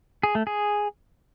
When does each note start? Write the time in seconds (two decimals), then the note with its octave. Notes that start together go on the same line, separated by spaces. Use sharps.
0.23 G#4
0.35 A3
0.47 G#4